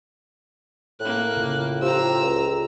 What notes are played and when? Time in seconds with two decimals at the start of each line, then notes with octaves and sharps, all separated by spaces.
1.01 A2 A#3 F#6
1.37 C#3 F4
1.82 F4 G4 C5 A#5 E6
2.22 C#2